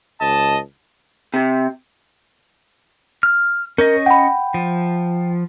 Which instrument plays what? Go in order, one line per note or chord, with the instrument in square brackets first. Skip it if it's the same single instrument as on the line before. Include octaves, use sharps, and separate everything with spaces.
[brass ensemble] C#2 D#5 A5
[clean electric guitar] C3
[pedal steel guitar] F6
[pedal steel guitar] C#4 C#5 D#5 [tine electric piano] A#4 [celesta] G6
[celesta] F#5 B5 [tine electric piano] G5
[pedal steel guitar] F3